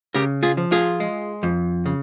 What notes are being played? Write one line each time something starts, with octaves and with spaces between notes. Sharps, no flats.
C#3 G4 A#4
F4 G#4
F3
F4 G#4
G#3
F2
C#3